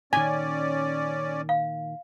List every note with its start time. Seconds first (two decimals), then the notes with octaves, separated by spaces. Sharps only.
0.13 A#2 D#3 C#4 D5 G#5
1.49 F5